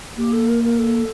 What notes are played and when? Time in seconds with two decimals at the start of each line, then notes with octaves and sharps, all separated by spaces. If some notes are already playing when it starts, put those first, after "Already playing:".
0.17 A#3 G4
0.32 A4
0.48 A#4
0.63 A#4
0.78 A4